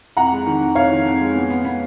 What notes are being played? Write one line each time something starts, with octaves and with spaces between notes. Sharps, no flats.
F2 F#5 A#5
G#3
D#3
F2
F2 C#5 F5
D#3
F2
G#3
B3
B3
B3